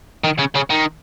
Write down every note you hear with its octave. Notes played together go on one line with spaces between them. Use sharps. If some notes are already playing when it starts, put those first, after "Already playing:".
D#3
C#3
C#3
D#3